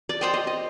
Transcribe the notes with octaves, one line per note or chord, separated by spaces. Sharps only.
D5
G4 C5 D#5 G5
D#5
D#5